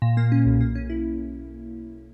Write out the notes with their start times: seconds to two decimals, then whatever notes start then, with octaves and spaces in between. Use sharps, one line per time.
0.02 A#2
0.17 A#3
0.32 C#4
0.46 B1
0.61 A#3
0.75 C#4
0.90 E4